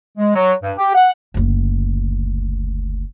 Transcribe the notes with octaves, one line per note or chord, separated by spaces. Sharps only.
G#3
F#3
G2
G4
F#5
F#1 D2